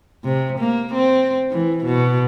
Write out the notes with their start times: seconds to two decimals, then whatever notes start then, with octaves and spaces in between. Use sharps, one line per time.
0.24 C3
0.59 A#3
0.94 C4
1.51 E3
1.85 B2